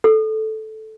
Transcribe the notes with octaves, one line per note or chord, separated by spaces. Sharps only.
A4